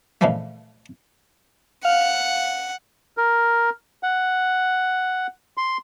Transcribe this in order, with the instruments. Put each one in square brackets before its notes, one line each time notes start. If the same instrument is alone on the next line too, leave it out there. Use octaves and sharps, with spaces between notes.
[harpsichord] A#2 C#3 E3 F3 G#3 A3
[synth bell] F5 [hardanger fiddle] F#5
[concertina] A#4
F#5
C6